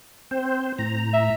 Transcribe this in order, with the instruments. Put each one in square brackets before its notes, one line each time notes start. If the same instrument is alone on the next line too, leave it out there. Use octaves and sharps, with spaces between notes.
[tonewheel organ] C4 C5
A2 A#5
[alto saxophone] E5